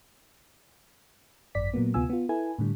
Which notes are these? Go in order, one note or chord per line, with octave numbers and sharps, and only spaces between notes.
G#1 F#2 D5 B6
A#2 F#3 A#3 B3
D2 C3 B3 F4 G#5 E6
B3 F4
E4 A4 B4 G#5
A2 D3 G3